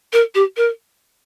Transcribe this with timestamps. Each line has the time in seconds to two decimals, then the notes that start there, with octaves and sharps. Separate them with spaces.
0.13 A#4
0.35 G4
0.57 A#4